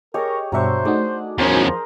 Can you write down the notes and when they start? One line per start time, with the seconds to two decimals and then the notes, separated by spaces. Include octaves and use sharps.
0.14 G4 G#4 A#4 C#5 D#5 C#6
0.52 G2 B2 F#3 D4 C5 E5 C#6
0.85 A3 D#4 F#4 G#4 D5
1.39 E2 F3 C#4 G#4 A#4 C5